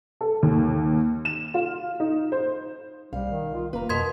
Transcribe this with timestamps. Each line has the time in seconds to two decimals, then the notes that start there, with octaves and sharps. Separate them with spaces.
0.21 A4
0.42 D#2
1.25 E7
1.54 F4
2.00 D#4
2.32 C5
3.13 B1 G3 F5
3.31 D#3
3.54 F4
3.73 F1 A#3 B4 A#5
3.89 F2 B2 A#4 C6 G#6